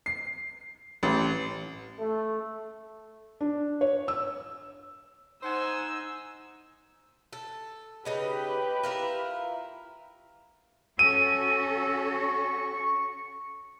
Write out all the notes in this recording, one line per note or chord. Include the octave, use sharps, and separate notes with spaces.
C7
A1
A3
D4
C#5
E6
D#4 C5 F#5 G#5 E6
A4
C#3 D#4 G4 B4 D#5
E4 F4 A#4
C#4 F#4 A4 E6 D#7
C#6